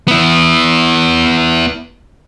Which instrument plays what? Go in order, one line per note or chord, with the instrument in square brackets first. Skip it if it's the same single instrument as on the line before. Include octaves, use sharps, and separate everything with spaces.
[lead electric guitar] B3 E4